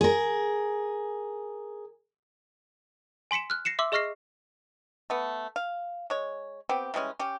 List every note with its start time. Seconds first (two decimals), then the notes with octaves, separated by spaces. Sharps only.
0.01 G#4 A#4
3.31 G#5 C6 B6 C#7 E7
3.50 F6 F#6
3.65 A#6 C7 C#7 E7
3.79 E5 C6 D6 E6
3.92 G#4 D#5 C#6 F6 A#6 C7
5.10 A3 B3
5.56 F5
6.10 G#3 C#5
6.69 B3 C4 G4
6.94 E3 G3 G#3 C#4
7.19 C#4 G4